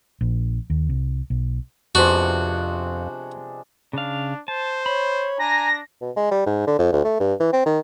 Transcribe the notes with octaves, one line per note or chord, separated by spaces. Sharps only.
A#1
D#2
C2
B1
F2 C3 F3 G#3 B3 D4 F#4
C#3 D4 F5
C5 A5
C#5 B5
D4 G#5 A#5 A#6
B2
G#3
G3
G#2
D3
F2
D2
A3
G2
E3
C4
D#3